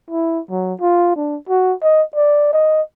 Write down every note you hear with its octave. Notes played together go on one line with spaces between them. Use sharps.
E4
F#3
F4
D4
F#4
D#5
D5
D#5